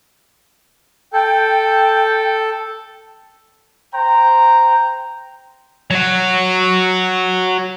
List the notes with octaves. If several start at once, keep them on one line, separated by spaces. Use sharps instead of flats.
A4 G5
C5 G5 A#5
F#3 F#4